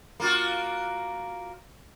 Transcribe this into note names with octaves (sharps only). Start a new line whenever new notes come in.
A#3 F4 F#4